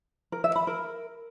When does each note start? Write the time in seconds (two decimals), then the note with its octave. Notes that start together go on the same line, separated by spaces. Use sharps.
0.32 A#4
0.44 E5
0.56 B5
0.67 A#4